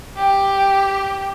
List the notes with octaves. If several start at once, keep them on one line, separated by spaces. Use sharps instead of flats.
G4 G5